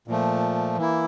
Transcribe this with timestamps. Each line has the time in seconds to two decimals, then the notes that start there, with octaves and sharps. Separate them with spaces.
0.08 A#2 F3 A3
0.77 E3 A#3 E4